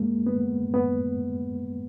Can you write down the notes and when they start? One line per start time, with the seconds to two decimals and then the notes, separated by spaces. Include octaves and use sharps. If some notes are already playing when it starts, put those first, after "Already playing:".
Already playing: G#3 A#3
0.26 B3
0.74 B3